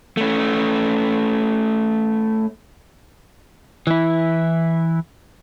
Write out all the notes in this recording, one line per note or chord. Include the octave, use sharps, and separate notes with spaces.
A3 C#4
E3 E4